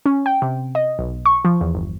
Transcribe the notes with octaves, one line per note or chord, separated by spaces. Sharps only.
C#4
G5
C3
D#5
B1
C#6
F3
E2
G1